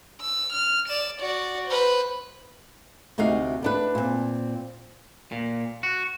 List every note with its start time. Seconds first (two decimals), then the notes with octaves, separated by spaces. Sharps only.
0.21 E6
0.52 F6
0.88 D5 E7
1.20 F#4 D5
1.67 B4 C5
3.18 D2 C3 D#4 F#4 F5
3.63 B3 D4 B4
3.95 A#2 C4
5.32 A#2
5.83 F#4